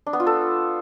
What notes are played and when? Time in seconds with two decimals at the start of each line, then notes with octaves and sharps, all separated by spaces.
0.06 D4
0.13 B3
0.20 F4
0.27 A4